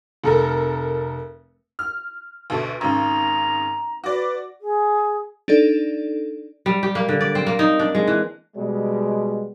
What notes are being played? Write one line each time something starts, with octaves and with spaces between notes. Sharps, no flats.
F1 A4 A#4
F6
D2 B2 A4
G#1 C#3 A#5
F#4 B4 D5
G#4
D4 D#4 A4 D5
G3
G4
A#3
D3
D5
C4
A#3
D#4
D4
G#3
E3
B2 G3 G#3